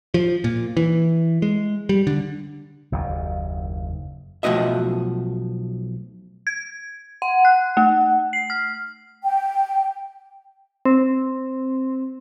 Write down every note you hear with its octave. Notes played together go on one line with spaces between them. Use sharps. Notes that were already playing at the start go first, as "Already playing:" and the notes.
F3
A#2
E3
G#3
G3
D3
F#1 D#2
B1 F3 A3 F#4 D#5 E5
G#6
F#5
F#6
A3
C7
F6
G5
C4